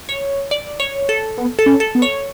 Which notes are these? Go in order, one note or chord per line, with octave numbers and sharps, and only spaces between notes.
C#5
D5
C#5
A4
B3
A4
C#4
A4
B3
C#5